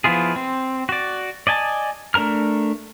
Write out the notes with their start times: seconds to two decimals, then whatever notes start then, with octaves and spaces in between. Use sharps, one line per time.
0.04 F3 B3 E4 F4 G#4
0.36 C4
0.89 F#4 D5
1.47 D5 D#5 G#5 A5
2.14 A3 D4 A#4 A#5 F6